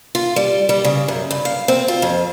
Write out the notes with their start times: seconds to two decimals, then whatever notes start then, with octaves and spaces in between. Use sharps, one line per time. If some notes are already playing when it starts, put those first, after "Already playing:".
0.15 F4
0.36 G3
0.69 G3
0.84 C#3
1.08 F#2
1.31 G2
1.45 F5
1.68 C4
1.88 F4
2.02 F2